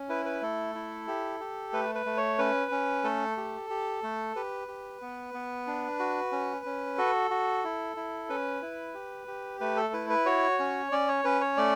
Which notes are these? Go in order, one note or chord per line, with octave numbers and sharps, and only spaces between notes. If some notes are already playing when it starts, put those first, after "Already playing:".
Already playing: C#4
E4 B4
B4
A3 A4
E4
G4
G4
A3 B4
B4
A3
C#5
C#4 B4
C#4
A3 A4
G4
G4
A3
G4 B4
G4
B3
B3
D4
F#4
C#4
C#4
F#4 A4
F#4
E4
E4
C#4 B4
E4
G4
G4
A3 B4
A4
E4 B4
B4
F#4 C#5
C#4
C#4 D5
C#5
C#4 B4
C#5
A3 D5